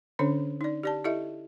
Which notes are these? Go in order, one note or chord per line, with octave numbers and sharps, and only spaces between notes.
D3 C#4 D4 A4 C#5
D#4 D5
G4 D5 A5
E4 G4 A4 D#5 E5